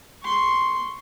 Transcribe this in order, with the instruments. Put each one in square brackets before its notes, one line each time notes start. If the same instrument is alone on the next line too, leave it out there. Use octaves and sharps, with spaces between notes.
[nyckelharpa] C6 C#6